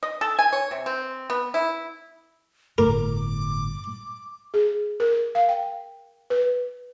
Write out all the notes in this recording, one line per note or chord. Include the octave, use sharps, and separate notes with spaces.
D#5
A4
G#5
C#5
C3
C4
B3
E4
G1 A2 A#4 D6
G#4
A#4
F5
G5
B4